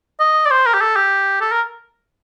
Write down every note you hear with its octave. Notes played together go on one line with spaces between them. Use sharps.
D#5
D5
C5
A#4
G4
A4
G4
A4
A#4